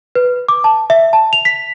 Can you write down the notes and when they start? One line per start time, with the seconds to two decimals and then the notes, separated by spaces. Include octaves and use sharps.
0.15 B4
0.49 D6
0.64 A5
0.90 E5
1.13 A5
1.33 F7
1.45 B6